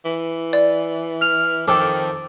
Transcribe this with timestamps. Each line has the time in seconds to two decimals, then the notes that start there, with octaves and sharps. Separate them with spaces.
0.05 E3
0.53 D5
1.21 F6 F7
1.68 F2 D#3 A4 G5 D6 E6